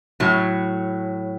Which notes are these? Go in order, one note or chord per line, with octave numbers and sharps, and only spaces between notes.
A2 F#3